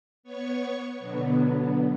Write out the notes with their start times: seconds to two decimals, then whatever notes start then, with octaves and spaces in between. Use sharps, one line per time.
0.23 B3 C#5 C#6
0.99 B2 D3 F#3 B3